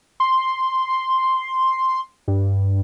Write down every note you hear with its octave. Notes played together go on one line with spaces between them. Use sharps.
C6
G2